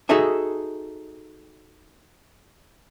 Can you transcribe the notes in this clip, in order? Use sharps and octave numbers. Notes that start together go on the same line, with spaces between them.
D#4 F#4 G#4 A4 E5 G#5